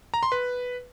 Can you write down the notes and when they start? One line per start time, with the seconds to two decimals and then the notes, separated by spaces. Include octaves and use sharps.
0.14 A#5
0.23 C6
0.32 B4